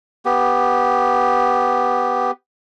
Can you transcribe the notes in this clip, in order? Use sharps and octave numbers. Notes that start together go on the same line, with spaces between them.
B3 G4